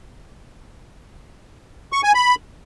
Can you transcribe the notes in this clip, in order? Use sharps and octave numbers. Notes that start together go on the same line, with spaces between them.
C#6
G#5
B5